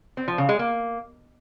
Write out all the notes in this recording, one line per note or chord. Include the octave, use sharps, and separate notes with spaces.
C4
F3
C#3
G#3
A#3